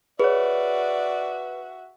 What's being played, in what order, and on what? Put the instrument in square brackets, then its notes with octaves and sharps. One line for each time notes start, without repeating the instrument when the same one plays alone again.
[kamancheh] F#4 E5 [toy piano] G#4 C#5 [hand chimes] B4 [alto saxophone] D5